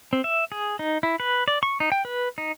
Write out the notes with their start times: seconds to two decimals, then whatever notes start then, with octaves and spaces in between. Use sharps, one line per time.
0.13 C4
0.24 E5
0.52 G#4
0.79 D#4
1.03 E4
1.20 B4
1.48 D5
1.63 C#6
1.80 D#4
1.92 G5
2.05 B4
2.38 D#4